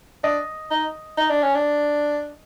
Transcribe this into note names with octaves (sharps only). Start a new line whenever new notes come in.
D4 D#5
D#4
D#4
D4
C#4
D4